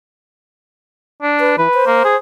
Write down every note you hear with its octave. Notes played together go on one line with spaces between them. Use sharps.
D4
B4
E3 B4
C5
A#3
G#4